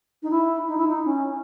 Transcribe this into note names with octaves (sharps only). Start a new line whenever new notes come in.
D#4
E4
D#4
E4
D#4
C#4